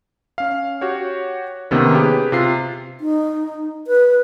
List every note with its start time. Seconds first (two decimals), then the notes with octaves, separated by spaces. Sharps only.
0.38 C#4 F5
0.81 F#4 G4 C#5
1.71 C3 D#3 A#3 B3 C#4
1.95 G4 G#4 B4
2.32 C3 F4 C7
3.01 D#4
3.87 B4